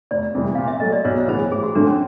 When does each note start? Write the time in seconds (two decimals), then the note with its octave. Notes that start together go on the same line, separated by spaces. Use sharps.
0.11 F1 D5
0.35 F2 C3 E3 G3
0.55 A#2 F5
0.68 E5
0.80 F#3 A3 D#5
0.92 D5
1.05 B1 C#5
1.28 A2 E3 G#3 B3 C5
1.52 A1 G#4
1.63 F#4
1.75 A2 F3 A3 C4 D4
1.87 C#4